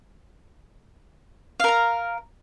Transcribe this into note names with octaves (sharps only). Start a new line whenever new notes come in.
A#4 F5 A#5